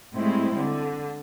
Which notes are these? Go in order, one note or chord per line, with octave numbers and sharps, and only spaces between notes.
A2 G3 G#3 C4 E4
D3